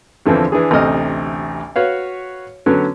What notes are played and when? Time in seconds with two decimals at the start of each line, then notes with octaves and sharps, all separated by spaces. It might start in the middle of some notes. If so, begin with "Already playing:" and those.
0.26 E2 D3 E3 F3 C4
0.52 E3 D4 G#4
0.71 A1 D2 C3 C4 D#5 F6
1.76 F#4 B4 C#5 F5
2.66 D3 F#3 B3 C#4 B4